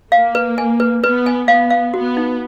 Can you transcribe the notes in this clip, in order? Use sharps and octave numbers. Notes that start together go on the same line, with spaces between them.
A#3 F5
B4
G#5
B4
B3 B4
G#5
B3 F5
F5
B3 F#4
D#4